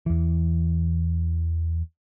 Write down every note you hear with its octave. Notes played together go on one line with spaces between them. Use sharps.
E2 E3